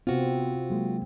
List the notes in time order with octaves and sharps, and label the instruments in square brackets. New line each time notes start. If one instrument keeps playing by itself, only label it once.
[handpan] C3 C4 [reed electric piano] B3 [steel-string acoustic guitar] F4 F#4
[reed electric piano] F#3 G#3 A#3